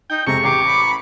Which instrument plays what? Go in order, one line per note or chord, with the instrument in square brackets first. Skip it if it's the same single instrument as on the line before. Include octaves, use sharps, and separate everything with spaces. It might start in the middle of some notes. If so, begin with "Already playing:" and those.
[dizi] D#4 [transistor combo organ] G5
[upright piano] F2 C3 G#3 [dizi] A#5 [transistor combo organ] C#6
[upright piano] A1 A#5 C7 [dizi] G4 [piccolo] D6
[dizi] B5